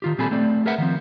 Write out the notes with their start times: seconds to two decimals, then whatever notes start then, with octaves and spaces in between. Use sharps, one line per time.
0.02 D#3 F4 G4
0.18 A#2 G3 C4 G#4 A4 B5
0.31 A3 C4 D5
0.66 G#4 A#4 B4 E5 F#5
0.78 D#3 F3 C4